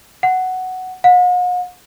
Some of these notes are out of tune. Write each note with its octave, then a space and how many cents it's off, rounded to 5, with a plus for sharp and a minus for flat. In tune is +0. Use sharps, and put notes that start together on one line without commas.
F#5 +5
F#5 -45